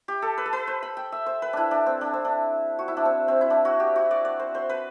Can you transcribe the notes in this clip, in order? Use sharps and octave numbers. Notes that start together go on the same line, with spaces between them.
G4
A4
B4
A4
B4
C5
B5
G5
E5
C5
B4
D4 E4
D4
C4
D4
C4
D4
F#4
E4
D4
C4
C4
E4
D4
F#4
G4
F#4
D5
D5
C5
C5
B4